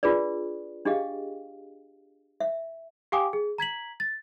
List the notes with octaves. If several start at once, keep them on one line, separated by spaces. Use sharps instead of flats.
D4 F4 G#4 B4 D5
D4 G4 G#4 D#5 F5 G5
E5
G4 F5 G5 G#5 D6 D#6
G#4
A#5 G#6 B6 F#7
A6